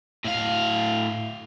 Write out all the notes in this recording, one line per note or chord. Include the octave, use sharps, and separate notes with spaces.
A2 F5